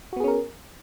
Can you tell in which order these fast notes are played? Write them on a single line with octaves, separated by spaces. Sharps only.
F#4 B3 G#4 C#4 A#4